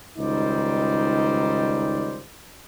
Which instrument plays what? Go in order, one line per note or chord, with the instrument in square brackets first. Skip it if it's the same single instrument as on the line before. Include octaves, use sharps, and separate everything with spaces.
[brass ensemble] C#2 D#3 G3 D#4 C5 D5